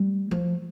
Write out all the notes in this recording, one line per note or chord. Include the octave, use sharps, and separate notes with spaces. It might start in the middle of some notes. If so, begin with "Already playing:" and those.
Already playing: G3
F3